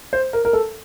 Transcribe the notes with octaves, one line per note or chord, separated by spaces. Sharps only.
C5
A#4
A#4
A4